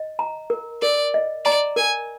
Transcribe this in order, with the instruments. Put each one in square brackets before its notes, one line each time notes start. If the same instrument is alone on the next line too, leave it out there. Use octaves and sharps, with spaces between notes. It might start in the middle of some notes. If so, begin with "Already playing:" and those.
Already playing: [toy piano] D#5
A#5
A#4
[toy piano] A#4 [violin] D5
[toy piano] D#5
[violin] D5 [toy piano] A#5
[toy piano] A#4 [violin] G#5